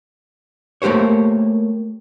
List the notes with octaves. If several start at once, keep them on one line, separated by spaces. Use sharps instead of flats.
A3 A#3 G4 C5 C#5